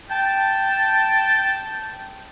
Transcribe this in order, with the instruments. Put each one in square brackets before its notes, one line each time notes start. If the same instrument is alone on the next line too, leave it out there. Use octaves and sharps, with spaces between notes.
[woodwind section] G5 A5